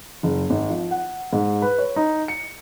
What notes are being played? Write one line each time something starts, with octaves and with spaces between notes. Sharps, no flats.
F#1
G#1
F3
F#5
G#2
B4
C#5
D#4
C#7